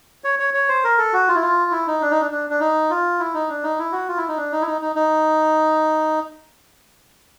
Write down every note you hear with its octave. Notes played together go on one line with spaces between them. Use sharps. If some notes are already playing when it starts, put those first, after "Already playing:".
C#5
C#5
C#5
C5
A#4
A4
F#4
F4
E4
F4
E4
D#4
D4
D#4
D4
D4
D4
D#4
F4
E4
D#4
D4
D#4
E4
F#4
F4
E4
D#4
D4
D#4
E4
D#4
D#4
D#4